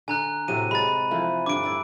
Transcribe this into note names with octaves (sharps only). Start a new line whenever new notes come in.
D3 G#5 A#5 F#6
A2 C3 F#3 D#7
G#3 B5 A6
E3 F3 A3
G2 D3 D6 D7
E4 D5